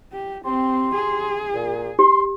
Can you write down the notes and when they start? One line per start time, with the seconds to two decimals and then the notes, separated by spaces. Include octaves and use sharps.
0.13 G4
0.45 C4 G4 C6
0.95 G#4
1.54 A#2
1.99 G4 C6